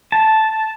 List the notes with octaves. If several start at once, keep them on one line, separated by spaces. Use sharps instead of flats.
A5